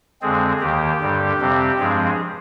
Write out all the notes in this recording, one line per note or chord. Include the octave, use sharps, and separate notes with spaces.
F2 D3 G#3 C4 G#4
D#2 D#3 A#3 G4
G2 D3 G3
F2 C3 G3 C4
G2 F3 G#3 C4 G#4